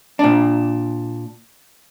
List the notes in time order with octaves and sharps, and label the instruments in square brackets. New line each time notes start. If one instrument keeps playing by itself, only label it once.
[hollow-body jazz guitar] A#2 D4